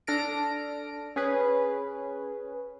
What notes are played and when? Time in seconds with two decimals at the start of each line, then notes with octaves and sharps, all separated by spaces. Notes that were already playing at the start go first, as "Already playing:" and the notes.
0.07 D4 A4 F6 A#6 D7
1.16 C#4 G#4 B4